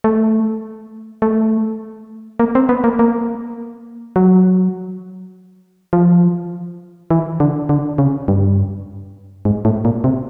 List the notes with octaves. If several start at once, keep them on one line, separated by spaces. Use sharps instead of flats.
A3
A3
A#3
C4
B3
A#3
A#3
F#3
F3
E3
D3
D3
C#3
G2
G#2
A2
A#2
C3